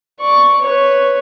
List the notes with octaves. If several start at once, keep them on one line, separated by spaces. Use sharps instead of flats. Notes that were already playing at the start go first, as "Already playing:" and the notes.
D5 C#6
B4 C#5